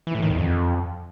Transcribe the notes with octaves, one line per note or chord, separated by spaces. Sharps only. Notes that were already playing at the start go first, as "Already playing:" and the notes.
E3
A2
D#3
E2
F2